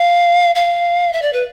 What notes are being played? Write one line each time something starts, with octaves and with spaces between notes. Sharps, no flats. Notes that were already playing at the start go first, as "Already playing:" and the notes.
Already playing: F5
F5
E5
D5
B4